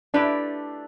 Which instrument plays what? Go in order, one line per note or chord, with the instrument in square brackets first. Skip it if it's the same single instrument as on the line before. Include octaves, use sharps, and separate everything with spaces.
[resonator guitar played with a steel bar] A3 E4 G4 B4 [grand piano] D4